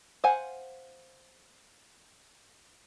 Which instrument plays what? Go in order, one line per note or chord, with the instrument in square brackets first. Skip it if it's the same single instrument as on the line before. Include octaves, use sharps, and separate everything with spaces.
[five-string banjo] C5 F5 F#5 G#5